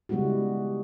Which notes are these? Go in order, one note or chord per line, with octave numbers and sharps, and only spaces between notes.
C#3 G3 G#3 B3 E4 F#4